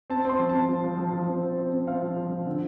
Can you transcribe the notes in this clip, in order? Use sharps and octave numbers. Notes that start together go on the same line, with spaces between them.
C4 A5
C4 C6
F3
C4 A5
F3
F3
F3
F3
C4
C4
C4
C4
C4 F5
F3
F3
F3
D3